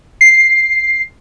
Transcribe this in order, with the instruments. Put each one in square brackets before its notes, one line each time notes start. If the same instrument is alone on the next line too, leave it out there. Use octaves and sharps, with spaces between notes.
[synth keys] C7